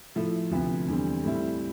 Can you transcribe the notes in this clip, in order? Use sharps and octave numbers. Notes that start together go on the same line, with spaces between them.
A2 F3 A3 E4
D2 C3 F3 B3
E2 D3 G3 C4
A2 G3 C4 E4